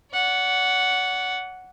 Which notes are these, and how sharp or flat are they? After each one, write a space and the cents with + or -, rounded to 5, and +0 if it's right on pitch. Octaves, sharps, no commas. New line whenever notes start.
D5 -45 F#5 +0